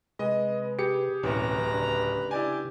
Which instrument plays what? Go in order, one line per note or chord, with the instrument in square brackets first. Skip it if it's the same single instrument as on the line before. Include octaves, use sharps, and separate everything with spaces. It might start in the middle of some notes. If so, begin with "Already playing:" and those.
[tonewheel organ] C3 B4 [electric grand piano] G#3 [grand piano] D#5
[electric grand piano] G4 G#4 [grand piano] C#7
[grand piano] D1 C2 [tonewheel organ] B2 E3 C#4 [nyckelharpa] B4 A#5
[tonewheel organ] C#3 D4
[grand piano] E4 D5 G#5 [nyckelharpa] G4